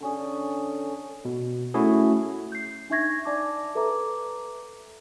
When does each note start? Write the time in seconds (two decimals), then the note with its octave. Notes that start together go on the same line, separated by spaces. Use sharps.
0.01 D3 C#4 G#4
1.25 B2
1.74 A3 C#4 E4 F#4 G#4
2.52 G6 C7
2.90 D4 D#4 E5 C#6 G#6 A#6
3.25 D5 G#5 A5 D6
3.75 A4 B4 E5 A#5 D6